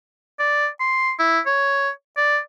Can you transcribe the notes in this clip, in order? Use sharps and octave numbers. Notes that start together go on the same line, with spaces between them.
D5
C6
E4
C#5
D5